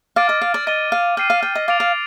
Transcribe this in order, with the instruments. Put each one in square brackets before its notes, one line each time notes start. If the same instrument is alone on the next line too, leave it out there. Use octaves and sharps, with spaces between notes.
[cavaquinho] F5 [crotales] D6 F6 A6 D7
[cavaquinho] D#5
F5
D5
[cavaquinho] D#5 [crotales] A6 D#7 G7
[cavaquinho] F5
[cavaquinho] G5 [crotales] F6 C7 D#7
[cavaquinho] F5
G5
D#5
[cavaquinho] F5 [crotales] D6 A6 D7 F7
[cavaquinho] F5